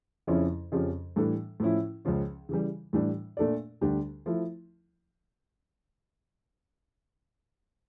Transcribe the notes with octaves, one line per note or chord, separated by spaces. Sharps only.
F2 C#3 F3 C#4 E4
F2 C#3 F3 C#4 G4
A2 E3 G3 D4 A4
A2 F3 C#4 E4
C#2 C#3 F3 C#4
C#3 E3 G3
A2 E3 G3 D4
A#2 A3 D4 A4 D5
D2 D3 G3 D4 G4
F3 A3 E4